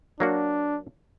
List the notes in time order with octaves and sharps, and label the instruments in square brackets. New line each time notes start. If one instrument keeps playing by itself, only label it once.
[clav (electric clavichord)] F#3 A#3 F#4 [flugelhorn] D4